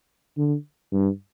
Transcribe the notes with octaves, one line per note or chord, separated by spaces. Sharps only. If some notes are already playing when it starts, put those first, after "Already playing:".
D3
G2